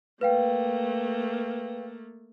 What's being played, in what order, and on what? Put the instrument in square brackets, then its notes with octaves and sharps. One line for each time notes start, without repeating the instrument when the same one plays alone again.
[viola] A3 A#3 [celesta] B4 F5 G5